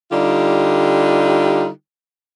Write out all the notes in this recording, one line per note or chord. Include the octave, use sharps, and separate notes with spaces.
D3 G3 D#4 F4 G4